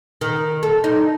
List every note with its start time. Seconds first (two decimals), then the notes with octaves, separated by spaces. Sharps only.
0.21 D#3
0.63 A4
0.84 D#4